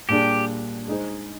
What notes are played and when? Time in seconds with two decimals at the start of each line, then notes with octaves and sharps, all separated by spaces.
0.09 A#2 G3 D4 G4 G#4
0.88 G#3 D#4 G#4 C5